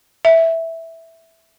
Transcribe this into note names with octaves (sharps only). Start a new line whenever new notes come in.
E5